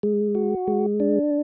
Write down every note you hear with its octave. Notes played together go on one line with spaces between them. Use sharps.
G#3
F#4
G#3
D4